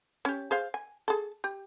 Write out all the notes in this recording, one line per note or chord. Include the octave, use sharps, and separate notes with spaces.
C#4 G4
G#4 C5 F5
G#5
G#4 A4
G4